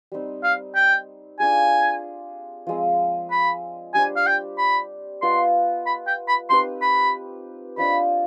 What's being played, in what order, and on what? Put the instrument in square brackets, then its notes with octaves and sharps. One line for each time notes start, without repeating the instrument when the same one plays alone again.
[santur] G3 C4 D#4
[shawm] F5
G5
[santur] D4 F4 G#4 [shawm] G#5
[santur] F3 G#3 C4
[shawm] B5
[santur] G3 D4 G4 C5 [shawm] G#5
[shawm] F5
G5
B5
[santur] B3 F4 B4 D#5 [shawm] C6
[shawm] B5
G5
B5
[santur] C4 D#4 G4 B4 [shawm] C6
[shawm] B5
[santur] D4 F4 C5 D#5 [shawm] B5